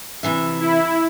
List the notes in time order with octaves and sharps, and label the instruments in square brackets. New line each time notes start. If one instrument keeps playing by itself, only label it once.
[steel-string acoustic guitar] C3 E3 E5
[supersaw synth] E4